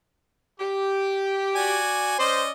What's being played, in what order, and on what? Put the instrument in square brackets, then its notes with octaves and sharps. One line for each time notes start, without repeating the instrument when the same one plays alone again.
[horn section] G4
[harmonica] F#4 D5 G#5
[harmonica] C#4 D5 D#5 [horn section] C5